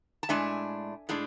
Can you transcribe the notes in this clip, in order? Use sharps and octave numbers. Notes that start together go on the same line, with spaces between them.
A5
A2 G#3 D4 E5 G#5
A2 G#3 D4